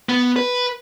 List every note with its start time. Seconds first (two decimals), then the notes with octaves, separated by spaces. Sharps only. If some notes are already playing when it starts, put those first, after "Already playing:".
0.09 B3
0.36 B4